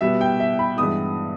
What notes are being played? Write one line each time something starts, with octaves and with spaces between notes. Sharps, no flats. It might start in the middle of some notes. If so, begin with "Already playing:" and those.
B2 G3 B3 E5
G5
E5
B5
G2 E3 G#3 B3 D#6